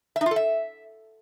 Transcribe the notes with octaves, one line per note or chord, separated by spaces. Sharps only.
E5
D#4
F4
A4
E5